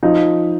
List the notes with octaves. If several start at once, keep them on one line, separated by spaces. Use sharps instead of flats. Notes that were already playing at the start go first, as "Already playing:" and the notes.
F3 D#4